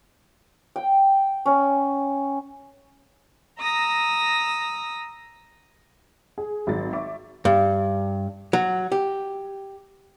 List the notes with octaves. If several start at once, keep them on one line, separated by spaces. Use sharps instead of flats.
G5
C#4
A#5 D#6 E6 A#6
G#4
G#1 F#3 A6
E5 C#6 D6
G2
F#3
G4